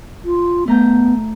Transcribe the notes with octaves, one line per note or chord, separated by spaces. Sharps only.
F4
A3 B3 A#5 G6